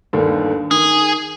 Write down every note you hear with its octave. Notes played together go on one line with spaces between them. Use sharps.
G1 D#2 D3
D#3 G#4